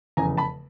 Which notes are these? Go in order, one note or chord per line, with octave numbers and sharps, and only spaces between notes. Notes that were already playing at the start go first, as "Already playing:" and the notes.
F1 E2 C#3 G#5 A#5
A5 B5